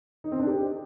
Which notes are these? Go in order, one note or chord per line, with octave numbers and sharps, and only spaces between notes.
D#4
C4
D4
G4